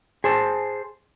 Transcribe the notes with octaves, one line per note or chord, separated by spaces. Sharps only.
G#4 C5 A5